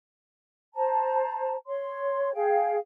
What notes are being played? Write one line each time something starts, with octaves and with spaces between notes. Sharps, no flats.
C5 A5 A#5
C#5 C6
G#4 F5 G5